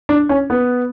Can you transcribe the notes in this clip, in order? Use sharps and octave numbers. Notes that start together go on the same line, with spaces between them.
D4
C#4
B3